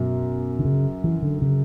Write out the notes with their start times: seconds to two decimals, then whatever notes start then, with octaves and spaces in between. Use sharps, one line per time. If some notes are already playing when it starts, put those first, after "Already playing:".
Already playing: F#2 B2
0.59 D3
0.65 C#3
1.04 E3
1.22 D3
1.42 C#3